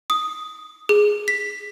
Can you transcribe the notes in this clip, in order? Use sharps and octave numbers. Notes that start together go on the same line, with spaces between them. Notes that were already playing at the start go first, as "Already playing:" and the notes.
D#6
G#4
B6